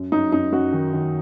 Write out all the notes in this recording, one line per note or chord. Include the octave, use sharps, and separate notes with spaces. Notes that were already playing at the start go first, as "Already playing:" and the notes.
Already playing: F#2
F#2 D#4
F#2 D#4
F#2 F#4
D#3
D#3